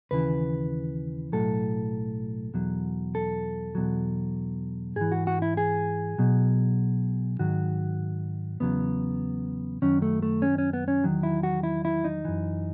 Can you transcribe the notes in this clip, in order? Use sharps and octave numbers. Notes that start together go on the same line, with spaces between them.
D#2 C#3 E3 B4
B1 A2 F#3 A4
E2 B2 F#3
A4
E2 B2 F#3
G#2 E3 G#4
F#4
F#4
E4
G#4
B1 B2 F#3
G#2 D#3 F#3 F#4
E2 C#3 F#3 B3
F#2 D#3 F#3 C#4
A3
A3
C#4
C#4
B3
C#4
E2 D#3 F#3
E4
F#4
E4
E4
D#4
F#2 E3